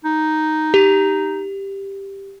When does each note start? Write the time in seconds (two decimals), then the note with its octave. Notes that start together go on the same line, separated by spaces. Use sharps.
0.05 D#4
0.74 G4